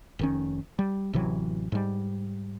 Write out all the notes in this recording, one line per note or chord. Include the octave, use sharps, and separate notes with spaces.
F1 D#3 C#4
G3
A1 C3 E3 F#3
G#2 G3